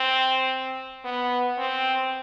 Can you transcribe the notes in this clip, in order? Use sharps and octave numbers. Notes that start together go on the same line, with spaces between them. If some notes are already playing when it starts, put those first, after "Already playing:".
Already playing: C4
B3
C4